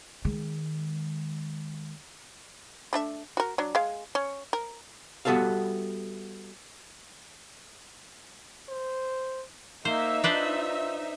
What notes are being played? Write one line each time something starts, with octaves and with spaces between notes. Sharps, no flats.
D#3 G#3
A3 D4 E5
F#4 A#4
F#3 D4
G#3 F5
C#4
A#4
G3 B3 F#4 A4 E5 F5
C5
A#3 D#4 C5 E5
D4 F4 B4 C5